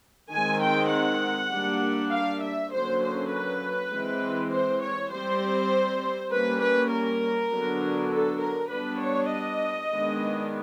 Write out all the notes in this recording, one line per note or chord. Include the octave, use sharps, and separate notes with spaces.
D#3 G#3 C4 G#5
G5
F#5
G3 A#3 D4
F5
E5
D3 F#3 A#3 C#4 C5
C5
B4
E3 G#3 C4
C5
C#5
G3 C4 C5
G3 A#3 C#4 B4
B4
A#4
D3 F#3 B3 D4
A4
A#4
G3 B3 D4 B4
C#5
D#5
D#3 G#3 B3 D4